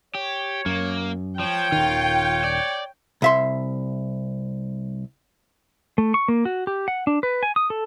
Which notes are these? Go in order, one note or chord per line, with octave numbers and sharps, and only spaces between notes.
G4 C#5
F#2 A#3
F3 C#5 G5
D#1 D#3 F4
D5
C2 E5 C6
A3
C#6
A#3
F#4
G4
F#5
D4
B4
G#5
D#6
A4